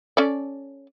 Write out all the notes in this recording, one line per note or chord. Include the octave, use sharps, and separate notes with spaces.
C#4 A4 D5